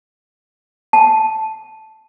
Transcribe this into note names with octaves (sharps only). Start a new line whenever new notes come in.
A5